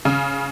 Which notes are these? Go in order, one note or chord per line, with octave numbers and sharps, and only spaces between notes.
C#3